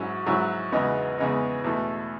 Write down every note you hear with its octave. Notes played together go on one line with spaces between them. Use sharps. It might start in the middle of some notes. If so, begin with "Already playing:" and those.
Already playing: G#2 F#3 C#4 E4
G#2 F#3 C#4 E4
E2 C#3 G#3 B3 D#4
E2 C#3 G#3 B3 D#4
E2 B2 A3 E4